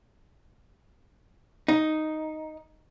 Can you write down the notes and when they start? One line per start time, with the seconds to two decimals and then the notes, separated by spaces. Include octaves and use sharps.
1.68 D#4